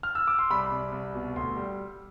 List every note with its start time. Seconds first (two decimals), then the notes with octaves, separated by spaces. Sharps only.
0.03 F6
0.15 E6
0.28 D6
0.39 C6
0.50 C2 B5
0.71 C2
0.92 C2
1.14 B2
1.36 D2 C6
1.56 G3